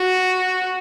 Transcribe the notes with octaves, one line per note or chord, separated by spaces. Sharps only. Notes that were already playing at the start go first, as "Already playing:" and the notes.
Already playing: F#4